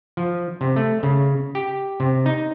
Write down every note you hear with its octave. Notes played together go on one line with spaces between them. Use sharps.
F3
C3
A3
C#3
G4
C3
D#4